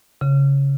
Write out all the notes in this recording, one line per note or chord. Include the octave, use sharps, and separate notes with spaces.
C#3